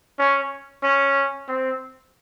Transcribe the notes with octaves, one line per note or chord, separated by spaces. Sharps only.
C#4
C#4
C4